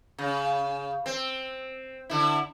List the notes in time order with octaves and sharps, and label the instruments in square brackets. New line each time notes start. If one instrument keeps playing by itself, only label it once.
[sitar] C#3
C4
D3 E4